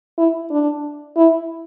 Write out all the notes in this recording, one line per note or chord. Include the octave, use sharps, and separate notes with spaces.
E4
D4
E4